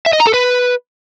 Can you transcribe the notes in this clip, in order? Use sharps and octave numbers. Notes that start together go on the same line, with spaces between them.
E5
D#5
A#5
A4
B4